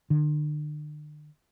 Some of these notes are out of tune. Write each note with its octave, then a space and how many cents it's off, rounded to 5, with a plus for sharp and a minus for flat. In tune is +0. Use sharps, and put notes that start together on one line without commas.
D3 +35